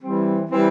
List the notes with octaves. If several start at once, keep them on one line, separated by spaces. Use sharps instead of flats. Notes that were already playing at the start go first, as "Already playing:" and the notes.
E3 G3 C4
E3 G3 C4